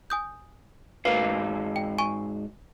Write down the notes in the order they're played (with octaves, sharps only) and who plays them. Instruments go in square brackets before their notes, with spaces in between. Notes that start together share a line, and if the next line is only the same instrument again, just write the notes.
[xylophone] G#5 D#6 G6
[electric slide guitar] G#2 F#4 F5 [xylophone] A#4 B4
[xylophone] G5
G#5 C#6 D#7